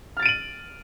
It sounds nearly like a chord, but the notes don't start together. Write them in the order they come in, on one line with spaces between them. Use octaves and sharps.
F6 A6 D7 D#7 F#7